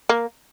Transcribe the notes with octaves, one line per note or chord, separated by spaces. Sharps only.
A#3